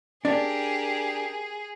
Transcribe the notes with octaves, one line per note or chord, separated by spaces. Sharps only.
D4 G4 G#4 A#4